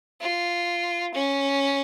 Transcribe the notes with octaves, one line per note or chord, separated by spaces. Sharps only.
F4
C#4